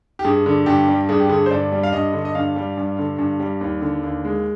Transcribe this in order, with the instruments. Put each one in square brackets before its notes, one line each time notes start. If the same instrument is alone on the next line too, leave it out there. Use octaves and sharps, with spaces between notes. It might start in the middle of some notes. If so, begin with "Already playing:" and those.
[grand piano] G4
G2 G#4
D3
G2 G4
G3
G2 G#4
G4
D3 G#4
C5
G2 D5
G3
F5
G2 D#5
D3
D#5
G2 F5
G3
G2
D3
G2
G3
D#2
D3
D#2
G#3